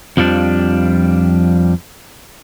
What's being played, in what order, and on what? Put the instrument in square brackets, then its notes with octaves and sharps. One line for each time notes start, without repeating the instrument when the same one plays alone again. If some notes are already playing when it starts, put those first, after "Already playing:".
[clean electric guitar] F2 F3 G3 C#4 D4